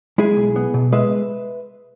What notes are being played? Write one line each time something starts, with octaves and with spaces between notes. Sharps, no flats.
G#3 E4 G#4
B1
B3
B2
G#3 B4 E5